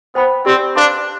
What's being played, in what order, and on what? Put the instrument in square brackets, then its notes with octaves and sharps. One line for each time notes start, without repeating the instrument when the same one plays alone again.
[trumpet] B3 [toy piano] C5 G5 B5
[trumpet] C4 [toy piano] G4 D5 G5 C6
[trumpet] D4 [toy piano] B4 F5 C6